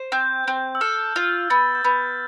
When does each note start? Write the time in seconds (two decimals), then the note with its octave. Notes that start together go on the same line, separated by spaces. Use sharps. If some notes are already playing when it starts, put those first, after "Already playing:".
Already playing: C5
0.12 C4 G6
0.48 C4
0.75 E6
0.81 A4 F6
1.16 F4 F6
1.50 B3 A6
1.75 G6
1.84 B3 A6